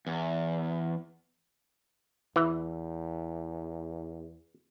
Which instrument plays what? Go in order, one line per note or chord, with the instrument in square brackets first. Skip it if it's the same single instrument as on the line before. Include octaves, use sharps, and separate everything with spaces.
[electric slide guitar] E2
[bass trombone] E2 [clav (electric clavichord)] E3